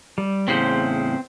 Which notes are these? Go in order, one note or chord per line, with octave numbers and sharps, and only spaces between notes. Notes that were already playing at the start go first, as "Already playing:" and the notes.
G3
E2 A2 C#3 C4 C5